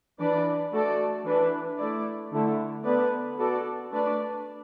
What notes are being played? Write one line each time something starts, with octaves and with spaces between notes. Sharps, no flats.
E3 D4 B4 D5
A3 F#4 A4 D5
E3 D4 B4
A3 E4 D5
D3 A3 E4
D3 B3 D4 B4 D5
B3 F#4 A4 D5
A3 D4 B4 D5